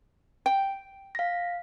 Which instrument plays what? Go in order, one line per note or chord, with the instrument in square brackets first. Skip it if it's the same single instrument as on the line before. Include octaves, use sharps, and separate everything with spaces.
[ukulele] G5
[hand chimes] F5 A#6